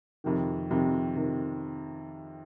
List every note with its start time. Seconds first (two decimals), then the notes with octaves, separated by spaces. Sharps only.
0.24 F2 C3 D#3
0.70 F2 C3 D#3
1.16 C3 D#3